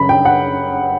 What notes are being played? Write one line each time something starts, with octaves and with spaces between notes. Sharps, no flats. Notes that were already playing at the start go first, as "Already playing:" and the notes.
Already playing: F#2 C#3 B5
G5
F#5